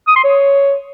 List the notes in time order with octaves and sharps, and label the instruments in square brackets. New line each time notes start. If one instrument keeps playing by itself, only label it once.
[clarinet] D#6
C6
C#5